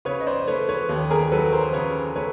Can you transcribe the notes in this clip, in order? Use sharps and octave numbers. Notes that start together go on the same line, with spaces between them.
C#3 B4 C#5
D#5
C5 D5
A3 B4 C#5
B4 C#5
D#2
G#4 A#4
F#3 A4 B4
A#4 C5
C#3 B4 C#5
A3 B4 C#5